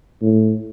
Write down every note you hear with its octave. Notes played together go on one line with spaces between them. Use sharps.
A2